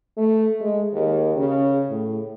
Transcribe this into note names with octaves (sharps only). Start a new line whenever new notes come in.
A3
G#3
D#2
C#3
A2